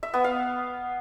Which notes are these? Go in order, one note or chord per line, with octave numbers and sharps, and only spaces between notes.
E5
B3
F5